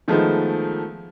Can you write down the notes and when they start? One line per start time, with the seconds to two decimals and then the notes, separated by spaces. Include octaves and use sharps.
0.08 D#3 F3 G#3 A3 B3